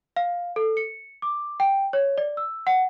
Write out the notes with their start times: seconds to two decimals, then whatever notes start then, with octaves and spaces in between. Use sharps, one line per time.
0.16 F5
0.56 A4
0.77 C#7
1.22 D6
1.60 G5
1.93 C#5
2.18 D5
2.37 E6
2.67 F#5